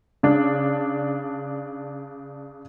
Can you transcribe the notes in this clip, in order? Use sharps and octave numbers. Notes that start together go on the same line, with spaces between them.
C#3 D4